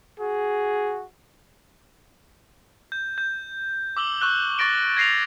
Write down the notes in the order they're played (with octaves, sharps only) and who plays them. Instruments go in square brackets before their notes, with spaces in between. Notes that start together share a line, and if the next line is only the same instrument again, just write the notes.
[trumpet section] F#4 G#4
[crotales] G6
G6
D6 E6 F#7 G7
C#6 E6 F#6 G7
C#6 A6 A#6 D7 G7
G#6 A#6 C7 D#7 F7